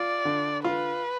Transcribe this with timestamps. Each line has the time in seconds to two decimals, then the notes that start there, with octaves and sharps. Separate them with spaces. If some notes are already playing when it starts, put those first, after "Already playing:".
Already playing: F4 D5
0.25 D3
0.64 F4 B4